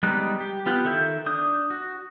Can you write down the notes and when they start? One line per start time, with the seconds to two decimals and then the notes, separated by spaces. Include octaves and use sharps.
0.03 G3 G#3 B3 D#4 F#6
0.40 G4
0.66 B3 F4 G4 F#5
0.85 D#3 A4 E5 E6 G6
1.26 D4 D#6 G6
1.70 F#4